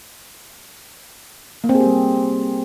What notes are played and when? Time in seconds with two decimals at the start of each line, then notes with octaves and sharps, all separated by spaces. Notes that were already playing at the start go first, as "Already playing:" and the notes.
1.64 A#3
1.69 C4
1.75 G#4
1.80 G4
1.86 G3